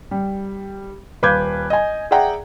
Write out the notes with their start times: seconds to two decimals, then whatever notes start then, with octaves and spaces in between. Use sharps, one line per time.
0.11 G3
1.23 D#1 B4 F5 D6 G6 G#6
1.70 D#5 G#5
2.11 G#4 D5 E5 F#5 G5 A#5